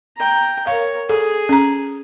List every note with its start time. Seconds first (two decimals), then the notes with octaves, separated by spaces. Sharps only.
0.17 G5 A#5
0.67 A#4 C#5 F5
1.09 G#4 A4
1.49 C#4 A#5